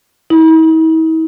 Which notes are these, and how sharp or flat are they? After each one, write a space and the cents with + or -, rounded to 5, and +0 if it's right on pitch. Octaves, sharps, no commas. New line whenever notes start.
E4 -45